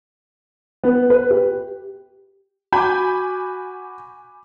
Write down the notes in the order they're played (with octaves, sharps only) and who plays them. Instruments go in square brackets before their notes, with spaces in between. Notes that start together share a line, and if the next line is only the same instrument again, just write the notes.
[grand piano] B3
B4
G4
[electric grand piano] F#4 D6 [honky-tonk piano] G#5 B5 G6